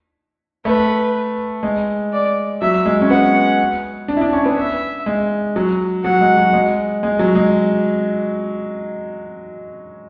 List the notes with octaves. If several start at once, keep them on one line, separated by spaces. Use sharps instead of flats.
A3 B4
G#3
D5
F#3 E5
G#3
C#4
B3 F#5
D4
E4
D4
C#4
B3
E5
G#3
F#3
F#3 F#5
G#3
F#3
G#3
G#3
F#3
G#3